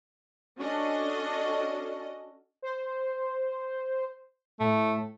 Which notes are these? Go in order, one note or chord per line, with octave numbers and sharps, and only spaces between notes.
C#4 D4 F#4 A4 D#5
C5
A2 A3